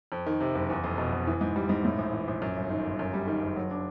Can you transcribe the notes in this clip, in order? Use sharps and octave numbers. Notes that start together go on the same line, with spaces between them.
F2
D#3
C3
F#1
E2
F1
B2
F1
E3
G#2
G3
G#2
A2
A#1
E3
A#1
F#2
G1
D#3
G1
F#2
G3
D#3
F#1
F#3
D4